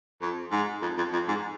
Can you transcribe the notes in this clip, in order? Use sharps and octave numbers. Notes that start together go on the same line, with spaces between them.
F2
G#2
F2
F2
F2
G#2